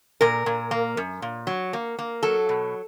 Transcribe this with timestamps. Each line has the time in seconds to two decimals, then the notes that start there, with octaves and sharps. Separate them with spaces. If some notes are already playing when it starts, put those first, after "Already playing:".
0.21 A#2 A#4
0.46 A#2
0.71 A#3
0.97 F#2
1.22 A#2
1.47 F#3
1.73 A#3
1.99 A#3
2.23 F#3 A4
2.49 B2